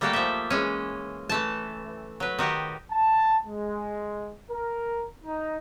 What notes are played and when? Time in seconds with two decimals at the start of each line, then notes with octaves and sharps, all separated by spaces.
0.01 G3 A3 A#3 F#4 G4 A4
0.13 F3 E5
0.50 E3 G#3 C#4
1.29 E3 A3 A5
2.20 F#3 B4
2.39 D#3 F#4 G4 D#5
2.92 A5
3.46 G#3
4.50 A#4
5.24 D#4